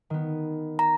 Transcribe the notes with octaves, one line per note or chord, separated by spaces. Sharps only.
D#3 B3
A#5